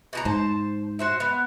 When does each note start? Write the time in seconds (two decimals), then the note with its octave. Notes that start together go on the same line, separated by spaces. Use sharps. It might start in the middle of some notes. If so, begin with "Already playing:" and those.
0.13 B2 G4 A#5
0.25 G#2 C5 A5
0.99 F#4 C5 E5
1.20 B3